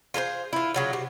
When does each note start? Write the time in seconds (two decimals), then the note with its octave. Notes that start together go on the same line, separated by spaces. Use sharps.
0.14 F4 G#4 A4 C5
0.53 E4 F4
0.74 C#3 F#3 F4
0.93 C3 F#4